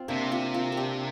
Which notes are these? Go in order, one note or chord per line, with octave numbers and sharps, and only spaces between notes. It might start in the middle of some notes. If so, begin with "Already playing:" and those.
Already playing: C4 F4
C3 A#3 D4
C4 F4
F4 A#4
A#4
D4 G4